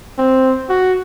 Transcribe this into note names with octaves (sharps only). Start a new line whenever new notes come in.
C4
F#4